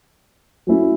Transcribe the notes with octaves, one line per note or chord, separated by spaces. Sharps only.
F#3 A3 C#4 E4